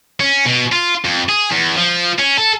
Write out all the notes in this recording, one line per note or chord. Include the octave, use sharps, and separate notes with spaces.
C#4
B2
F4
F2
G#4
E2
F3
C#4
A4